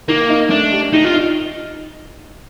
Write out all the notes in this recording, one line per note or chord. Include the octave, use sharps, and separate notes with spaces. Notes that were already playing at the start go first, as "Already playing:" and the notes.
D#3 A#3
D#4
A3 D4
G4
D#3 D#4
F4
D#4